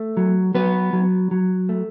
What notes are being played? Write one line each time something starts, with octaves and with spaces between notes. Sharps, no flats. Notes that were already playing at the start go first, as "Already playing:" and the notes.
Already playing: A3
F#3
F#3 B3 B4
F#3
F#3
A3